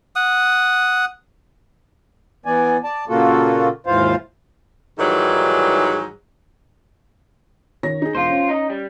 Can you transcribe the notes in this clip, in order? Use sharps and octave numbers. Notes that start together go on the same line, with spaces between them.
F#5 D#6
E3 B3 D5 G#5
D5 A5
A#2 C#3 A#3 F4 F#4 A4
D#2 G#2 E3 F4 C5 F5
G#2 D#3 E3 F#3 G3
D#3 C#5 A#6
D#4 G#4
E1 F4 C5
C#4
D#4 D#5
G3